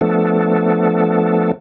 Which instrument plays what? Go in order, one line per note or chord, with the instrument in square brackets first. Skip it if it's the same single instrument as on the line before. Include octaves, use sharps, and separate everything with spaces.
[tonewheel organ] F3 A3 B3 D4 A4